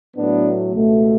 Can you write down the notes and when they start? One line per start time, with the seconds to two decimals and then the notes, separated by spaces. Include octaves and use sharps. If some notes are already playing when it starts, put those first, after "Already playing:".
0.17 A2 F#3 A3 B3 D4
0.74 C#2 B2 A3